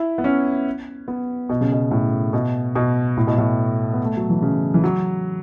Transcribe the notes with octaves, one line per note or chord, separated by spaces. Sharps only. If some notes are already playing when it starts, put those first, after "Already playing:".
Already playing: E4
B3
C#4
B3
B2
C#3
B2
A2
B2
B2
A2
B2
A2
B3
A3
F#3
E3
C#3
E3
F#3